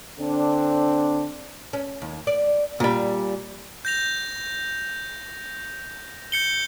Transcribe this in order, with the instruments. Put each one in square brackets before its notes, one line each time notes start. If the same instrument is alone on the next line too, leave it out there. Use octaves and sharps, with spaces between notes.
[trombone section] D3 C4 D4
[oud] C#4
D#2
D5
[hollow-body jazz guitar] A#2 G3
[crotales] G6 A#6 F7
G6 C#7 G7